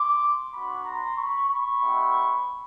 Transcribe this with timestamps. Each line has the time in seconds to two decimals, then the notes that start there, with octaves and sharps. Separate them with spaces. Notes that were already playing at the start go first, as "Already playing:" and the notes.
Already playing: C6 D6
0.53 B3 D4 F#4 B5 C#6
0.85 A#5 C6
1.17 B5 C#6
1.49 B5 C#6
1.81 A3 C4 D#4 F#4